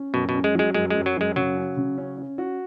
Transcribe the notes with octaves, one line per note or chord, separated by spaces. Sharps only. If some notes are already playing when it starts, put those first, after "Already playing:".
Already playing: C#4
F#2 B2
B2
C#4
G#3
F#3 G#3
F#2 G#3
F#2 G#3
F#3
F#2 G#3
C#3 F#3
C#4
C#3
C#4
C#4
F#4